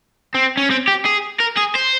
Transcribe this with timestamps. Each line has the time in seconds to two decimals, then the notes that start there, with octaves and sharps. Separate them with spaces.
0.35 C4
0.57 C#4
0.70 C4
0.88 G4
1.05 G#4
1.40 A#4
1.57 G#4
1.75 C5